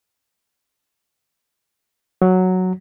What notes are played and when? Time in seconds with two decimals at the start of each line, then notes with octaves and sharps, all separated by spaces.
2.22 F#3